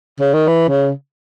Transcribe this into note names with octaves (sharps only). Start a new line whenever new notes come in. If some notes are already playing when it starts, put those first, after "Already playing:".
C#3
D#3
E3
C#3